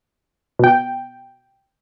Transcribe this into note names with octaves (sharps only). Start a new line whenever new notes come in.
B2 G5